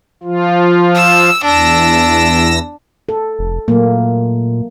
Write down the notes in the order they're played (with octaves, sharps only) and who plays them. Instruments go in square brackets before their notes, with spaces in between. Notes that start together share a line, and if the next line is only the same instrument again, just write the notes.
[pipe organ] F3 F4
[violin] E6
[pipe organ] E2 E6 A#6 [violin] D4
[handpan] A4
[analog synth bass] F1
[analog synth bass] A#2 [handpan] F#3 A3 A#3